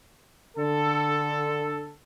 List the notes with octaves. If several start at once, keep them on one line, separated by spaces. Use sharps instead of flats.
D3 A4